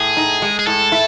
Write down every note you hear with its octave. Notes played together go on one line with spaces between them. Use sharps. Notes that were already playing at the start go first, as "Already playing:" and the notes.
Already playing: A2 G#4
D#4
G#3
G#4
A2 A4
E4